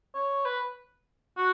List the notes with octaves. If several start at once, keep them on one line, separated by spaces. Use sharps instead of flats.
C#5
B4
F#4